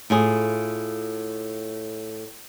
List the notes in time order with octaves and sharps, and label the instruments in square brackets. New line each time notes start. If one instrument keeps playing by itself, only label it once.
[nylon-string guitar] A2 F4 G#4